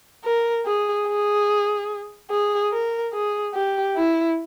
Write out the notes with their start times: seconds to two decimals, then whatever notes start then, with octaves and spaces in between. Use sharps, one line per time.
0.24 A#4
0.65 G#4
1.07 G#4
2.30 G#4
2.72 A#4
3.13 G#4
3.54 G4
3.96 E4